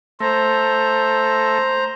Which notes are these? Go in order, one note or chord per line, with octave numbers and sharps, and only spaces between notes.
A3 C5 A#5